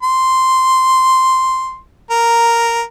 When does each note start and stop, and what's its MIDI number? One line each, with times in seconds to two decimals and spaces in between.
0.03 1.78 84
2.11 2.82 70